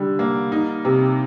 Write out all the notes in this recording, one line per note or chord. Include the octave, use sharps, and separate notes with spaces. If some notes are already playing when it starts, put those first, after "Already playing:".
Already playing: D3 G3
A#3
D#4
C3